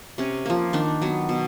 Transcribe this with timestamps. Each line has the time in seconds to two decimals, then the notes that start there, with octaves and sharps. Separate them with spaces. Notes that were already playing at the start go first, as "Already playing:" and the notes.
0.18 C3 C#4
0.45 F3 A#3
0.73 D#3 D4
1.02 F#3 B3
1.29 B2